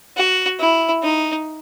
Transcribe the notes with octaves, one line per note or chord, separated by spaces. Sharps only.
F#4
E4
D#4